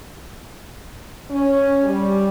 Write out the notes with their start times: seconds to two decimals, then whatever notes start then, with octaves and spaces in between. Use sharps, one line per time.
1.30 C#4
1.83 G3